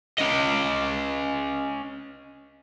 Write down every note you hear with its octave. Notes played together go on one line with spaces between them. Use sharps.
C#4 D#5